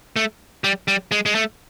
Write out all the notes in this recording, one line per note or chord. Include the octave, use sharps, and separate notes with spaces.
A3
G3
G3
G#3
G#3
A3